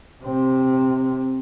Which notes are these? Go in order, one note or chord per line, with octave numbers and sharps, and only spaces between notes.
C3 C4